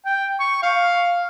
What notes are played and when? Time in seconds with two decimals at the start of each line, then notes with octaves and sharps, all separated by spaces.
0.06 G5
0.40 C#6
0.63 F5